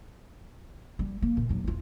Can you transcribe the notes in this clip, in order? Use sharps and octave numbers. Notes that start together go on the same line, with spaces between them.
G3
A#3
A#2
D#1 F#3
E2 F4